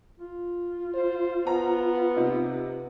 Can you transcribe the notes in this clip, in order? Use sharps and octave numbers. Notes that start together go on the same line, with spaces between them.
F4
C5
B3 A#5
C3 D#4